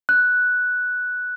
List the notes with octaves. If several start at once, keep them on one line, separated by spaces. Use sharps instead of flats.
F#6